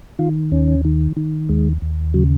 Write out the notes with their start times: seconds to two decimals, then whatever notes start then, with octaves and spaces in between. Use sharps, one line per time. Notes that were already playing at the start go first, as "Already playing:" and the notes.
0.19 D#3 F4
0.52 D#2 C#4
0.85 D#3
1.17 D#3
1.49 D#2 G#3
1.82 D#2
2.14 C#3 F#3